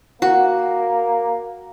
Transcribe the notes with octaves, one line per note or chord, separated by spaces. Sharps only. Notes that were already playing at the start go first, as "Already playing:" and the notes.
A#3 F#4